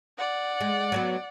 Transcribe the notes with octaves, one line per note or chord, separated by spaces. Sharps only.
D5 F#5
G#3
F#3 G3 B3